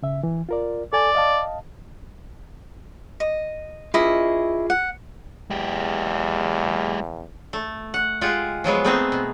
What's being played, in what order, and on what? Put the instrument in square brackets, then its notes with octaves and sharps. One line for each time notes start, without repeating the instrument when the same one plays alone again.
[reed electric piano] C#3 E5
E3
F4 A#4 D5
[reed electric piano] A4 G#5 [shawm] D5
[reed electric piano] D#5 F5 A5
[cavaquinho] D#5
[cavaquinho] E4 D#5 [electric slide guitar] F4 G#4
[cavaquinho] F#5
[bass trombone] E2 [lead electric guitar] G#3 G4
[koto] A3
F#5
G#3 F4 G4 F#5
F3 F#3 G#3 B3
G#3 A3 B3 C4 D#4 G#4
B2